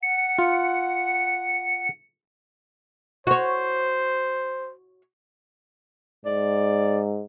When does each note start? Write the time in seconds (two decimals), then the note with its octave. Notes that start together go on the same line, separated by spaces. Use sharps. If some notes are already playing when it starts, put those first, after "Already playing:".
0.03 F#5 C#7
0.38 F4
3.27 F#4 C5 C#5
6.25 G#2 D5